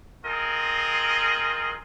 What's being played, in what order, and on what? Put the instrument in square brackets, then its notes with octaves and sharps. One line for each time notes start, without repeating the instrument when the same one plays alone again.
[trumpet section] C4 F4 G#4 A#4 D#5